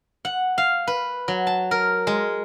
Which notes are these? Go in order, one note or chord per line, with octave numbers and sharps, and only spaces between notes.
F#5
F5
B4
F#3
A5
A#4
G#3